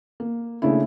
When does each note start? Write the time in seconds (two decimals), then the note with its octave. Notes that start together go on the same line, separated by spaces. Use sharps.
0.20 A#3
0.62 C#3 A3 A#3 D4 E4